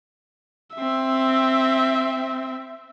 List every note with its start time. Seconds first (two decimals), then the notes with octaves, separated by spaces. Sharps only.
0.75 C4 E5